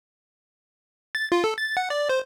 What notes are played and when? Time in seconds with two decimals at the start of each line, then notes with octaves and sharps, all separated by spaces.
1.15 A6
1.32 F4
1.44 A4
1.58 A6
1.77 F#5
1.90 D5
2.09 C5